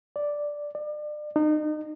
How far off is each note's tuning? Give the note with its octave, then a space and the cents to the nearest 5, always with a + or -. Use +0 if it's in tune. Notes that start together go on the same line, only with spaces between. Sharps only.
D5 +0
D5 +35
D#4 -35